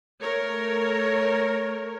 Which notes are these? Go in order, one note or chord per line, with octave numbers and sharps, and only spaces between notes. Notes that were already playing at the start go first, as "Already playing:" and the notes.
A3 A#4 C#5